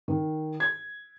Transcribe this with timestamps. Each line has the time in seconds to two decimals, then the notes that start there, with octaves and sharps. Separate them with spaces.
0.08 D#3
0.60 G#6